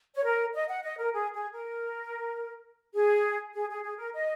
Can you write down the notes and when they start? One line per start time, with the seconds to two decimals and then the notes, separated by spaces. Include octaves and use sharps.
0.15 C#5
0.24 A#4
0.53 D#5
0.69 F#5
0.84 D#5
0.98 A#4
1.13 G#4
1.34 G#4
1.53 A#4
2.94 G#4
3.54 G#4
3.69 G#4
3.83 G#4
3.98 A#4
4.14 D#5